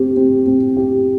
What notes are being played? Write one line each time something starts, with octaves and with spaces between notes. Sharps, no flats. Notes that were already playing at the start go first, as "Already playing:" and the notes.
Already playing: C4 G4
C4
C4
G4